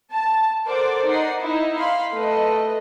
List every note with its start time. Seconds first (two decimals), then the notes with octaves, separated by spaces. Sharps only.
0.13 A5
0.67 A4 A#4 C5 D5 F#5 D6
1.06 D#4 F#5 C7
1.40 D#4 E4
1.78 F5 B5 C6
2.13 A3 B4 D#5